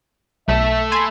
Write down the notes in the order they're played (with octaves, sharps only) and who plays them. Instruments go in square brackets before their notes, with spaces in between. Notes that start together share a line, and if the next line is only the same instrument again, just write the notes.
[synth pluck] B1 [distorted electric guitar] A3 A4 [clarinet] E5
[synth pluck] G#5 B5 [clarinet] C6